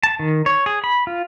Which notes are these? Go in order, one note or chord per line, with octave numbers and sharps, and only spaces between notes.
A5
D#3
C#5
G#4
B5
F4